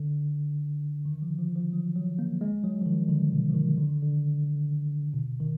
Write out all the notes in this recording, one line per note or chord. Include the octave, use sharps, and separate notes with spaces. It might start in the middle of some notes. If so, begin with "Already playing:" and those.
Already playing: D3
D#3
F3
F3
F3
F#3
F#3
A#3
G#3
F#3
F3
D#3
D3
B2
F3
D#3
D3
D#3
D3
B2
D#3